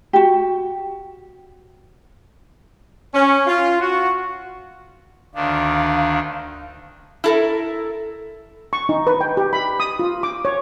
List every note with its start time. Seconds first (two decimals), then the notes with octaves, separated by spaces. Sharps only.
0.13 F#4 G4
3.14 C#4
3.47 F4
3.80 F#4
5.35 D2 D#3 D4 F5
7.24 E4 A4 A#4
8.73 C#6
8.89 D#4
9.07 B4
9.21 G5
9.37 G4
9.53 B5
9.80 D#6
9.99 F4
10.23 D6
10.45 C#5